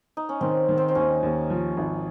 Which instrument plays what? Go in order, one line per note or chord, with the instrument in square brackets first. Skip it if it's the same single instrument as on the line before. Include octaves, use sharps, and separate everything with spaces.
[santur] D#4
C#4
[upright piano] D#3 [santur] C4
[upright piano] D#3
[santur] C4
C4
[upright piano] D#2 [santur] C#4
[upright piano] D#2
F3
G#1